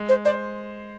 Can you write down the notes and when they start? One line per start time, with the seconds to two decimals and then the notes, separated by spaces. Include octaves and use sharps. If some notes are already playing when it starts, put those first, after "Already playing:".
Already playing: G#3
0.09 C5
0.25 C5 D5